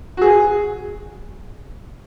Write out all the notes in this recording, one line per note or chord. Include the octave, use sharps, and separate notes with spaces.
F#4
G#4